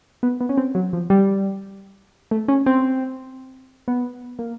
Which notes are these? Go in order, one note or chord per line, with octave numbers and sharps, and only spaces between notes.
B3
B3
C#4
C4
F#3
F3
G3
A3
C#4
C4
B3
A#3